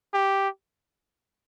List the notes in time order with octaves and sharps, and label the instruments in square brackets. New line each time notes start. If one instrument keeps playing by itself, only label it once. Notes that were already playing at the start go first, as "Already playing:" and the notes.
[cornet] G4